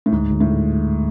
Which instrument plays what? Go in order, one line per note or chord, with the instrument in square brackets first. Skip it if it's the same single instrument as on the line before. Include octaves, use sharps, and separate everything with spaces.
[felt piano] A2
[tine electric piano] D2 [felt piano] G#2
[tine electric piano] D2
[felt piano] A2
[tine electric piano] D3